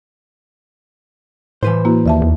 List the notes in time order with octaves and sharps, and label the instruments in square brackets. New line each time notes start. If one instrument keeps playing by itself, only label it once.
[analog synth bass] A2 [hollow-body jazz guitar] E3 B4 C5
[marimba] A#3 E4 F#4
[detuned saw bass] D#2 [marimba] D5 E5 A5
[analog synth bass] E2